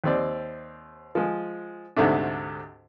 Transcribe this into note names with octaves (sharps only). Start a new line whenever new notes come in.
D#2 C4 D5
F3 G#3
D2 G#2 C3 A3 D4